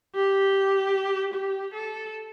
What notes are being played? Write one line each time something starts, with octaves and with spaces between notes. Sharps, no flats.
G4
G4
A4